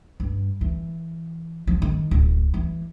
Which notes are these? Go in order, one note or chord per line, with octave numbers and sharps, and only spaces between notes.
G2
E3
F3
D#3
D1
E3